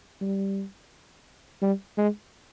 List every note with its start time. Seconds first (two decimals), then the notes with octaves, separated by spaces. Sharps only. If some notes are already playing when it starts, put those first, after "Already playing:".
0.21 G3
1.62 G3
1.97 G#3